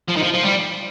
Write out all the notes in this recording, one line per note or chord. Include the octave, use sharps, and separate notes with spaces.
F3
D#3
F3
F3
G3